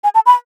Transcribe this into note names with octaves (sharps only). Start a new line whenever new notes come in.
G#5
A5
B5